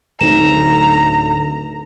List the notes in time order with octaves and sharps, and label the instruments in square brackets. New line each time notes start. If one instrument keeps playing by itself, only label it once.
[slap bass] D1 D2 A3 [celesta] D#4 E7 [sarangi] A#5